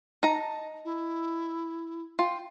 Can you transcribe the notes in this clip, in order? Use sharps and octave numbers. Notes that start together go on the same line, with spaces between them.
D#4 A5 A#5
E4
F4 G5